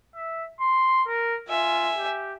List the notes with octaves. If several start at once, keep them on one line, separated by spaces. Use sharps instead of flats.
E5
C6
A#4
F4 E5 G#5
G4